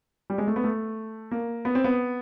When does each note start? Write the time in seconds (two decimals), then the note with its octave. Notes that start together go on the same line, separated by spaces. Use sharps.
0.30 G3
0.38 G#3
0.47 A3
0.56 B3
0.64 A3
1.31 A#3
1.65 B3
1.75 C4
1.84 B3